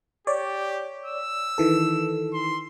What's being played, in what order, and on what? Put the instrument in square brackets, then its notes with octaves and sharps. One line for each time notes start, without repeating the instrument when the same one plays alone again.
[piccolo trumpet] G4 [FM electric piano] C#5 D5
[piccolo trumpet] E6
[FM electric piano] D#3 E3 A4
[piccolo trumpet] C6